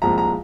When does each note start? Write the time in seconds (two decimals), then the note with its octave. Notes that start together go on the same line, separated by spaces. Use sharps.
0.02 C2 A#2 F3 G#3 A#5
0.18 A#5